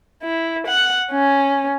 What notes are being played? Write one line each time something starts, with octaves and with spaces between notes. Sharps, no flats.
E4
F#5
C#4